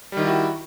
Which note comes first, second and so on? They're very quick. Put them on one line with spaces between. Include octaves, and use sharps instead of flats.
G3 D#3 E4 F#4